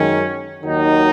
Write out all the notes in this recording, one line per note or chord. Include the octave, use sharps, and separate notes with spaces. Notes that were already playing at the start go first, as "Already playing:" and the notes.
Already playing: F#2 D#3 G#3 C#4
D#2 D#3 F#3 D#4